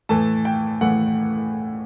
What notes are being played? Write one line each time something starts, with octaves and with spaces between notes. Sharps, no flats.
A2 E3 A3 A5
G5
A2 E3 A3 F#5